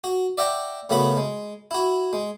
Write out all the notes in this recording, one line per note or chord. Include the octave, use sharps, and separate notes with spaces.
F#4
D5 E5 F#5 G5 A#5
F#2 C#3 A3 B3 F#4 B5
G#3
E4 F#4
G#3